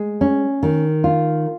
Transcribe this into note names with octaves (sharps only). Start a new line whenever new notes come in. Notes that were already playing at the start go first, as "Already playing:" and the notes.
Already playing: G#3
C#4
D#3
F4